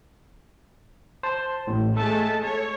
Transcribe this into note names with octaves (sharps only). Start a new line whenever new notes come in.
C5 A5
A1 A2
G#3 A3 A4 A5
C#5